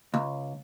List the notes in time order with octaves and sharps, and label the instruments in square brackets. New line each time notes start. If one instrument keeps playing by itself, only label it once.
[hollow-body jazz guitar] C#2